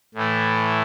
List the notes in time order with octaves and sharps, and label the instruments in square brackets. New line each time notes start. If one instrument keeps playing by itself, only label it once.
[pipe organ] A2 E3 A3